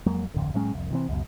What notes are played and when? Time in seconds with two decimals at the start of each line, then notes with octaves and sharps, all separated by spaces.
0.06 F2 F#3 G#3 A#3
0.34 D1 G#1 F2 D3
0.54 A2 F#3 G#3 C#4
0.74 C2 F2
0.91 C3 E3 C4
1.09 C#2 F#2 B2